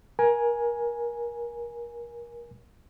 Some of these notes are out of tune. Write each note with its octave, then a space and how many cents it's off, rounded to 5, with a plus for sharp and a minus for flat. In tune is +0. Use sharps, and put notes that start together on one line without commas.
A#4 +25 G#5 +0